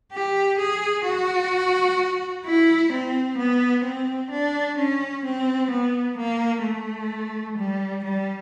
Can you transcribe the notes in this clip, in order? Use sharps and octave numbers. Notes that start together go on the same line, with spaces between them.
G4
G#4
F#4
E4
C4
B3
C4
D4
C#4
C4
B3
A#3
A3
G3
G3